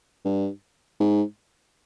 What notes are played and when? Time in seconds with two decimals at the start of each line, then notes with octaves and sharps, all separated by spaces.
0.25 G2
1.00 G#2